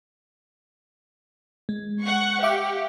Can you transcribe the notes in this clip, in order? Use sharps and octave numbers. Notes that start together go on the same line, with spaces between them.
G#3
F#5 C#6
G4 E5 F5 D6